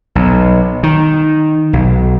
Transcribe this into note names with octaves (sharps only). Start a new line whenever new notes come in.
B1
D#3
B1